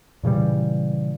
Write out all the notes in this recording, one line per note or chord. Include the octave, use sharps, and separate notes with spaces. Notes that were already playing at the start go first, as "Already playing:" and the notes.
A#2 C#3 E3 G3